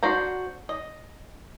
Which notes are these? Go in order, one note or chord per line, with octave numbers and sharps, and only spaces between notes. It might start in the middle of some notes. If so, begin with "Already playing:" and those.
D4 F#4 C5 A#5
D#5